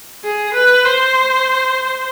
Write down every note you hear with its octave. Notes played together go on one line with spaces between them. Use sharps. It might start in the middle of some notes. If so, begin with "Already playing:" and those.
G#4
B4
C5